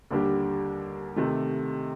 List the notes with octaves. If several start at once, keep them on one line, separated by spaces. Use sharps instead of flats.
D#2 D3 G3 D4 G4
C3 D#3 A3